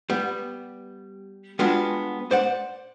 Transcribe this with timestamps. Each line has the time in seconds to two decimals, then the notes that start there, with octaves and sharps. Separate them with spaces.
0.10 G3 B3
1.59 G3 G#3 B3 D4 F4 F#4
2.31 C5 D5 F#5